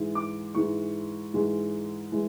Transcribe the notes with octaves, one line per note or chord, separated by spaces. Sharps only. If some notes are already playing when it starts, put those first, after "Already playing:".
Already playing: G#2 E3 G#3
D6
G#2 E3 G#3 C#6
G#2 E3 G#3
E3 G#3